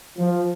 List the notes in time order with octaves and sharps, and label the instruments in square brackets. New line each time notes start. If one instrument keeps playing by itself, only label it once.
[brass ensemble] F3